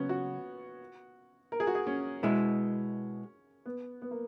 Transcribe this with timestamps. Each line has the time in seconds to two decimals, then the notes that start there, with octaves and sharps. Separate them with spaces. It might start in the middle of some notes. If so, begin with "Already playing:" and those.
Already playing: C#3 F#3 B3 C#4
0.09 F#4
1.52 A#4
1.60 G#4
1.67 F#4
1.75 G#4
1.87 C#4
2.23 B2 G#3 B3 E4
3.66 B3
4.02 B3
4.11 A#3